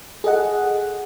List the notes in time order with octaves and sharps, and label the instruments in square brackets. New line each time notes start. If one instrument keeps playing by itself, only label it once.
[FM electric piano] G#4 A4 D#5 F#5